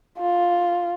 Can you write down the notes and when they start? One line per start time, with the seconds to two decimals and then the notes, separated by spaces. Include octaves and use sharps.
0.19 F4